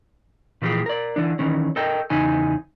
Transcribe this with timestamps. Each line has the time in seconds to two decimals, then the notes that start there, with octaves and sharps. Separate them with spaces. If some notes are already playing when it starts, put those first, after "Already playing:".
0.62 A#2 E3 F3 C#4 G4 G#4
0.86 A#4 D5
1.16 D3 E3 D4
1.39 D#3 E3 C#4
1.76 A4 A#4 D#5 G5
2.10 E2 C#3 D#4 G#5